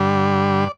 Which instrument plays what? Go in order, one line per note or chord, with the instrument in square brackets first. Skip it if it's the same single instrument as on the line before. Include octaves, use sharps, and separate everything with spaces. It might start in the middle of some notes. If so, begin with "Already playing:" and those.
Already playing: [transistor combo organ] G2 D3 G3 D5